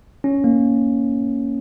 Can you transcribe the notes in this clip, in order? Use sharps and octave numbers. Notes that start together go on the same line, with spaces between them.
C#4
A#3